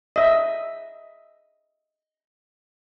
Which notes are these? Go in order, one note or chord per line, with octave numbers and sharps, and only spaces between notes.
D#5 E5